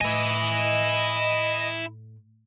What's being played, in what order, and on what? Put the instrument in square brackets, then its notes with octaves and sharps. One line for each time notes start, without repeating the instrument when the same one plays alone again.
[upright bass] A2 [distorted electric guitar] E4 G#5 [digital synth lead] D#5